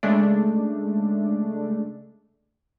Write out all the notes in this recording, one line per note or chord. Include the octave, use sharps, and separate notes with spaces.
C#3 G#3 A3 D4